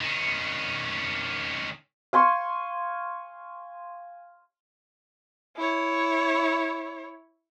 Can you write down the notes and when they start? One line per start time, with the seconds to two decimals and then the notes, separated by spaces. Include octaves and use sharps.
0.01 D#3 C#4
2.13 F5 G#5 C6 C#6
5.56 E4 C#5